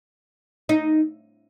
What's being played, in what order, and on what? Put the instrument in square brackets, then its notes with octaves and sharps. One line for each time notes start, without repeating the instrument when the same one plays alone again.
[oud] D#4